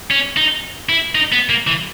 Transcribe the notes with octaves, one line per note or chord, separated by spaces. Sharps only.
C#4
D#4
E4
D#4
B3
A#3
E3